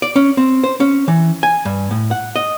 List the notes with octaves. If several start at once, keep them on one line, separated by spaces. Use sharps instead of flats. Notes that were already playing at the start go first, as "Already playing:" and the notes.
D5
C#4
C4
C5
C#4
E3
G#5
G2
A2
F#5
D#5